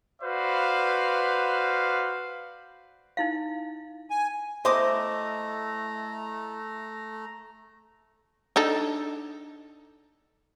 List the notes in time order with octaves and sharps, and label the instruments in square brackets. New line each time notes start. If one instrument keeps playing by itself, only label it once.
[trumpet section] F#4 B4 C5 D5 F5
[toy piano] D#4 E4 F5
[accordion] G#5
[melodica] A3 A#5 [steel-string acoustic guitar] E4 [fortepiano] C5 [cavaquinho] D#5 D6 D#6
[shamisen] D4 D#4 A4